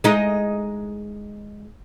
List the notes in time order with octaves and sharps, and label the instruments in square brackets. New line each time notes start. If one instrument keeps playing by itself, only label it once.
[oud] G#3 D#4